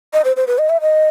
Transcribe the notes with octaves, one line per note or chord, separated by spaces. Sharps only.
D#5
C5
C5
B4
D#5
E5
D#5